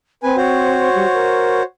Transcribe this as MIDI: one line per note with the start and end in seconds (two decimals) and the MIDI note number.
0.23 0.89 60
0.23 0.36 71
0.23 0.36 80
0.36 1.63 66
0.36 1.63 72
0.36 1.63 73
0.95 1.07 55
1.13 1.61 70